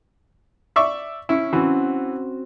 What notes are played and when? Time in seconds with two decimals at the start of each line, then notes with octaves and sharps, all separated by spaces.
0.76 D5 E5 C#6
1.29 C#4 E4 C#6
1.53 E3 C4 F#4